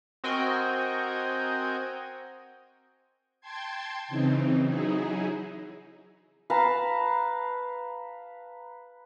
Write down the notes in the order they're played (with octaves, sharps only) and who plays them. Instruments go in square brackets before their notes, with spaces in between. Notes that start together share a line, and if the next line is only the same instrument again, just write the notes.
[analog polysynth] C4 F#4 A#4 D#5 G5 G#5
[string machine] G5 A5 C6 G#6
C#3 E3 C4 D#4
F#3 D#4 E4 G#4
[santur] B4 F5 A5 A#5